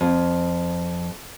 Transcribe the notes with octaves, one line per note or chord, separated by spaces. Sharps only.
F2